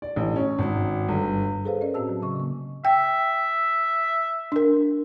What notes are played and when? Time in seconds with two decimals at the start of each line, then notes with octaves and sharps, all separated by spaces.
0.02 D5
0.16 A1
0.36 C#4
0.59 G#1
1.09 G1
1.65 G#4 A4 B4 C5 F5
1.81 C#4 A#4 D5 D#5
1.94 A2 C4 F#4 A5 E6
2.09 F#3
2.22 C#3 D#5 C#6
2.36 C#3 A#3
2.85 E5 G5
4.52 D4 A#4